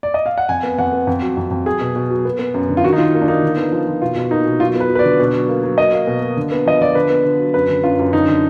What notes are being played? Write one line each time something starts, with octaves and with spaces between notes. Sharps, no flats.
D5
D#5
F5
F#5
F2 G#5
B3
F2 F#5
B3
F2
F#3
F2
F2
F#3 G#4
B2
B2
F#3
B3
B3
F#2
D3
F4
D#3 F#4
D#4
D#3 F4
A#3
D4
A#3 D#4
D3
B3
F3
F3
B2 F4
B2
A#3 D#4
B2
F#3 F4
B3 B4
F#3
B4
D5
D3
B2
F#3
A#3
F#3
A#3 D#5
A#3
B2
A#3
D3
B3
F3 D#5
F3 D5
D3 B4
B3
D3
F#3
F#2 B4
D3
F#2 F4
F#2
D3 D#4
D3